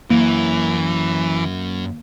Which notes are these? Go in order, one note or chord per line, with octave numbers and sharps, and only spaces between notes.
F#2 E3 A#3